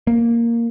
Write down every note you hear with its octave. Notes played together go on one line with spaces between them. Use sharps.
A#3